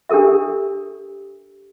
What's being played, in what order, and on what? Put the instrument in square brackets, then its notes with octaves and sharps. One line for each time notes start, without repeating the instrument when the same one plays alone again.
[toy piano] D4 G4 A4 A#4 E5